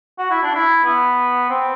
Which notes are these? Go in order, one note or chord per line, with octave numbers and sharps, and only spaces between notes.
F#4
E4
D4
E4
B3
C4